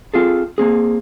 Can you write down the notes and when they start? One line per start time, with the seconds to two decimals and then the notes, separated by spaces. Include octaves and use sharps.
0.14 C4 F4 G#4 A4
0.58 A#3 C4 G#4